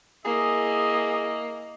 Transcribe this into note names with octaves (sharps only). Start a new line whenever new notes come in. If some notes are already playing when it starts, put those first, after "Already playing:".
A#3 E4 G#4 D#5